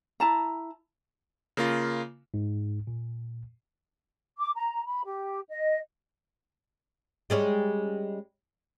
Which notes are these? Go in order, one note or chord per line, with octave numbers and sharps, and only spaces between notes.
E4 A5 A#5
C#3 A#3 F4
G#2
A#2
D6
A#5
B5
G4
D#5
G3 G#3 C#4